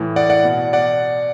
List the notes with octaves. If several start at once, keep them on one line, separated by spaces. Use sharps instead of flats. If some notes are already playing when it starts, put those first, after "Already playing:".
Already playing: A2 E3
D5 F#5
D5 F#5
B2
D5 F#5